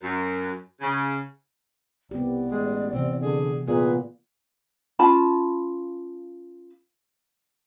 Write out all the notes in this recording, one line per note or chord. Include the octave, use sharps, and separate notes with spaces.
F#2
C#3
C2 B3 G4 D5
A1 G#3
C3 E3 C4
D3 G#4
A#2 B3 G#4 B4
C#4 F4 A5 B5